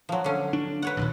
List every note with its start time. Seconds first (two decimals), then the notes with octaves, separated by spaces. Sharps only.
0.09 F3 F#3
0.24 D3 C#4
0.53 D4
0.82 B4 C#5 F#5
0.97 A1 D#2 A#2